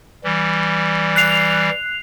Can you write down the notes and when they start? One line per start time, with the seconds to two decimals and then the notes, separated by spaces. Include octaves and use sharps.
0.24 E3 G3
1.16 F#6 C7 F7